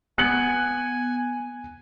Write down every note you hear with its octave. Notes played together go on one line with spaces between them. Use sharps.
B3 G#5 F#6 C#7 F#7